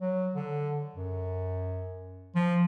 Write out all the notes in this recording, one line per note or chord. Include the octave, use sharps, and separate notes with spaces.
F#3
D3
F#2
F3